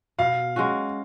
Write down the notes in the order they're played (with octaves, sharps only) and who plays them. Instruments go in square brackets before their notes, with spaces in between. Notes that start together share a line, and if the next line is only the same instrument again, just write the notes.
[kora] B2 [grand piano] F5
[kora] G#3 C#4 F#4